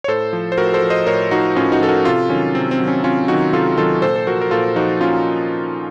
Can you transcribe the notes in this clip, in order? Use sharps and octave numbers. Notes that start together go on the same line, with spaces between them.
C#5
A2 A4 C5
F3
C5
A2 F#4 A#4
A4 C5
F3
C5 D#5
A2 A#4 C#5
F3 D#4 F#4
A2 C#4 F4
D#4 F#4
F3 A4
F#4 A#4
C3 F4 A4
D#3 F#3 C#4
C3 C4
C4
D#3 F#3
C#4
C3 C#4 F4
D#3 F#3 D#4 F#4
C3 F4 A4
D#3 F#3 F4 A4
A#2 A4 C5
A4
F3 F#4 A#4
A#4
A#2 F4 A4
F3 D#4 F#4
A#2 C#4 F4